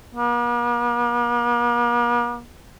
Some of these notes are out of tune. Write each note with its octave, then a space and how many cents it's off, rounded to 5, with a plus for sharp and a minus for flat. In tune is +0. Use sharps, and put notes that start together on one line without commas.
A#3 +45